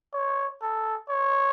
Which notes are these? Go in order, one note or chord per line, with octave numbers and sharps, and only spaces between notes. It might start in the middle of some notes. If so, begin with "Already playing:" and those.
C#5
A4
C#5